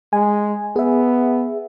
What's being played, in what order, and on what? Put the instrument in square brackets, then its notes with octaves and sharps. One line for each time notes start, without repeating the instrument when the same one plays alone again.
[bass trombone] G#3 [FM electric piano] G#5
[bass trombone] B3 [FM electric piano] G#4 E5